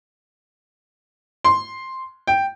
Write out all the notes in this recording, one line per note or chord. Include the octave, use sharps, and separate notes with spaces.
C6
G5